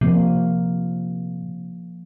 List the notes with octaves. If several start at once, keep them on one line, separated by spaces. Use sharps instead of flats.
C3 F3 A#3